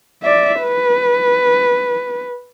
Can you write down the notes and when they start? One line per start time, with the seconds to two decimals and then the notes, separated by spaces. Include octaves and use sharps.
0.23 D5 E5
0.62 B4